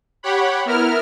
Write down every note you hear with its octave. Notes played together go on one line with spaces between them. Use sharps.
G4 C#5 F#5 B5
B3 E4 A#4 F6